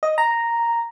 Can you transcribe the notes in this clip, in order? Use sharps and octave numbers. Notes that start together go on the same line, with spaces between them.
D#5
A#5